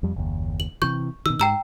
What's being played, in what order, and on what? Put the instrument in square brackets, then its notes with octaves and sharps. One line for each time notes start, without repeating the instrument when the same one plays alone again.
[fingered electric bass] F2 G3
F#1 D#2
[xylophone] F#7
[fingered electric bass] C3 E3 [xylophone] C#6 G6
[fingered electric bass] B2 D#3 [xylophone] E6
[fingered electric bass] G#2 [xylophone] G5 A#5 E6